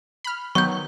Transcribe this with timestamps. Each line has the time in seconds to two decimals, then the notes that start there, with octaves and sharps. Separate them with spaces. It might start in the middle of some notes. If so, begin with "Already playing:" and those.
0.24 B5 F6
0.55 D#3 F#3 B3 C#6 G6